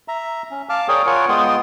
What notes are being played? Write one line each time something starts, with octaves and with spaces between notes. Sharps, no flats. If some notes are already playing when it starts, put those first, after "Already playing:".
E5 A#5
C#4
F5 A5 D6 F6
G#4 A#4 C#5 D5 G5 D#6
F4 A#4 C#5 F#5 G#5
G#3 B3 F4 G5 C6 D#6